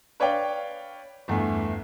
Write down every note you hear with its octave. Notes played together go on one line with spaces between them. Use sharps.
B4 C#5 D5 F5 G5
G1 E2 A3